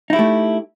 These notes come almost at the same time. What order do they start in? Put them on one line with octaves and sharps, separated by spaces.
D#4 E4 G4 A3